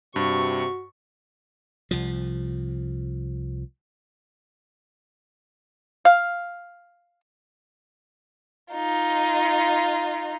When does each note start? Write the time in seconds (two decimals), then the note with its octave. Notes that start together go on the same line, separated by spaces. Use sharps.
0.16 G2 C3 F#4 C#6
1.91 C2 F3
6.05 F5
8.74 D#4 F4